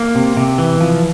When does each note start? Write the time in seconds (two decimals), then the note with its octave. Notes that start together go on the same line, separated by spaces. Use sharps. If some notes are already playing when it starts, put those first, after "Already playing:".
Already playing: A#3
0.15 C3
0.37 C3
0.58 E3
0.80 F3